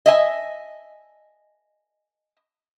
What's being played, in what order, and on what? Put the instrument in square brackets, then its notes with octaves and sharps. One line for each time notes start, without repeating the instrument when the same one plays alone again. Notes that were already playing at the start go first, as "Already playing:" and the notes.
[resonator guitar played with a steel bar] D#5 E5 G#5